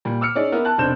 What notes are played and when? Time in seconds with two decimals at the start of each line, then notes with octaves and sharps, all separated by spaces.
0.05 A#2 G3
0.21 D6 E6 F6 C#7
0.35 C#4 D#4 G#4 D5
0.52 B3 E4 A#4
0.65 A5 F#6
0.78 F1 B2 D4 C5 G6 E7